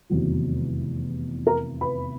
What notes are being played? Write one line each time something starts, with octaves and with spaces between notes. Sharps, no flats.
F1 E2 C3 D#3 F#3
A#4 A#5
B4 B5